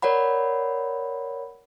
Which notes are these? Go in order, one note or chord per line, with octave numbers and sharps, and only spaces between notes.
A#4 C#5 D5 F#5 B5